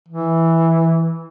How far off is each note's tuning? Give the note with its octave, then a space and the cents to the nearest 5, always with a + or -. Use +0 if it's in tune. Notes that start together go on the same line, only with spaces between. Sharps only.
E3 -5